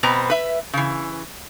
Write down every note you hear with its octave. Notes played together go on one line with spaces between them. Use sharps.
B2 B3 C4 A#5
B4 E5
C#3 E3